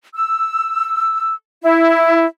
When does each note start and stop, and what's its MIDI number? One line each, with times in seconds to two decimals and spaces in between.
0.14 1.33 88
1.61 2.25 64